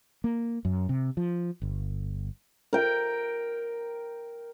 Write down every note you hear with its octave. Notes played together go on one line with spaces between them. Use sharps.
A#3
F#2
C3
F3
G1
A#4 G5